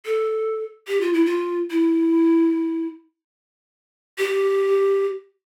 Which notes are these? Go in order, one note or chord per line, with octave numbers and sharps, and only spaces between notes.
A4
G4
F4
E4
F4
E4
G4